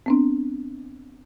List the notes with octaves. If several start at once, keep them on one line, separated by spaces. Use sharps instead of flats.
B3 C4 D4